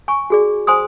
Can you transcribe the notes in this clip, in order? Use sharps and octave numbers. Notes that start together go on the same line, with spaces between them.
G#5 C#6
F#4 G#4 D5
C5 G#5 C6 D#6